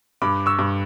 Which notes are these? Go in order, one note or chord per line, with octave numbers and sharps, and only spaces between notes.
G2 B5 D6
C#6 E6
G2